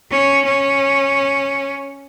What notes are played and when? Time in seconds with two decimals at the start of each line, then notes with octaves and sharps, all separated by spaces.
0.11 C#4
0.45 C#4